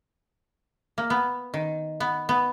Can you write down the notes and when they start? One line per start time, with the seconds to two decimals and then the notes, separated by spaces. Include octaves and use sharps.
0.98 A#3
1.10 B3
1.54 D#3
2.00 B3
2.29 B3